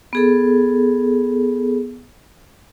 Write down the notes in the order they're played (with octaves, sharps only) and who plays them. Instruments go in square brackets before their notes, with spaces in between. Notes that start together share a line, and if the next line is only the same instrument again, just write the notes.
[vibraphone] B3 G#4 A4